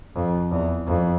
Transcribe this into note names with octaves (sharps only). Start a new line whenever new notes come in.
F2
E2
F2